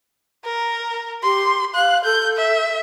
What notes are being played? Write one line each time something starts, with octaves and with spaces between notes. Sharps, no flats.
A#4
G4 C6
F5 F#6
A4 G6
E5